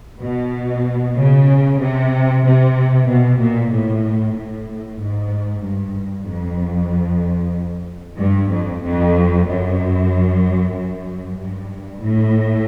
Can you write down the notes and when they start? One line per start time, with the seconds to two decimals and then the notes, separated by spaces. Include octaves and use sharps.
0.21 B2
1.17 C#3
1.81 C3
2.44 C3
3.08 B2
3.40 A#2
3.72 A2
4.36 A2
5.01 G#2
5.64 G2
6.28 F2
8.19 G2
8.52 F2
8.83 F2
9.47 F#2
10.75 F#2
11.39 G2
12.02 A2